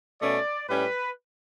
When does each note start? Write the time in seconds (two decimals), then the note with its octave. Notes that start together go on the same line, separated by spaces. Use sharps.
0.21 B2 A3 C#4 D5
0.68 A2 G3 C#4 B4